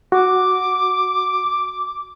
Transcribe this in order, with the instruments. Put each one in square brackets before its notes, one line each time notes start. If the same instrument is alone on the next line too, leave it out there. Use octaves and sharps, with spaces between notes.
[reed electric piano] F#4 [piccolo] D6